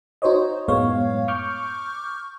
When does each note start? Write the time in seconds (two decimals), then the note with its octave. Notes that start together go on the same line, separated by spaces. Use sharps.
0.22 D#4 F#4 C5 C#5 D#5
0.68 F#2 A2 G#3 B3 C#5 F5
1.28 C#6 D6 F6 G6